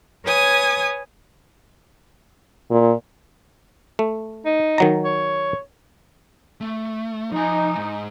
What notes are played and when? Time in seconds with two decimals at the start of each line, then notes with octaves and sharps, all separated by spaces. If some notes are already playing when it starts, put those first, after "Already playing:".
0.25 B4 C#5 G#5 D#6 G#6
2.71 A#2
3.99 A3
4.45 D#4
4.78 D#3 F#3 A#5
5.04 C#5
6.61 A3
7.32 F3 D#4 G#5
7.77 G#2